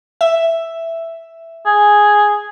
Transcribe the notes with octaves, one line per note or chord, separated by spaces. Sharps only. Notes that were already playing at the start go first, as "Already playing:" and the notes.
E5
G#4